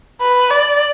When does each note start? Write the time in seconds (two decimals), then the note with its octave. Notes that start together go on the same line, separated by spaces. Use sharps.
0.21 B4
0.50 D5